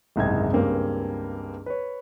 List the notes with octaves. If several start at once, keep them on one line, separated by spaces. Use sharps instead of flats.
F#1 C2 G#2 D#5 G5 G#6
C#2 G2 A#3 C4 C#4 G4
B4 C#5